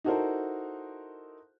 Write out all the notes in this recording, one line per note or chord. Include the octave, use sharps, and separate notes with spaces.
D#4 E4 F#4 A4 A#4 C5